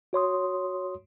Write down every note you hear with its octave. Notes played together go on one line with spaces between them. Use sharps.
F#4 C#5 C6 D#6